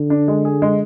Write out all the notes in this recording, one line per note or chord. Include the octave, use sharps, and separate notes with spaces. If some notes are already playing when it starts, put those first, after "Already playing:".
Already playing: D3
D4
G#3
G#4
G#3